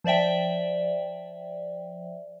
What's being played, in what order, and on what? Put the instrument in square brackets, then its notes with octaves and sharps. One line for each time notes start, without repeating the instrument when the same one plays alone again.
[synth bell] F3 C5 D5 E5 G5